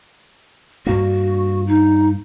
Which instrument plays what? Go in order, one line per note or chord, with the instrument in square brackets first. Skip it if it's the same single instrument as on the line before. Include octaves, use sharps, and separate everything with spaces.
[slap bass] G2 A#3 [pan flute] F#4
[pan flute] D#4